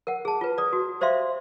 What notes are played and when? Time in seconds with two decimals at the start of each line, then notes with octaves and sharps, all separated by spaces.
0.07 A#4 F#5
0.25 G#4 A5
0.41 F4 B4
0.58 D5 D#6
0.73 F#4
1.01 G4 C5 D5 E5 F5 C6